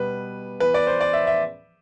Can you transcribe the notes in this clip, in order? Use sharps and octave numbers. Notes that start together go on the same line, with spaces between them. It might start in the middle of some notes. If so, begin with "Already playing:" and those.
Already playing: B2 G3 B3 B4
E3 B3 B4
D5
C5
D5
E5
E5